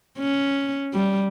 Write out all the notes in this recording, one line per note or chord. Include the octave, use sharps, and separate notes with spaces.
C#4
G3